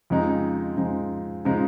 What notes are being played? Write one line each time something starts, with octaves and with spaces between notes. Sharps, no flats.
F2 C#3 F3 G#3 D#4
F2 C#3 F3 G#3 D#4
C#3 F3 G#3 D#4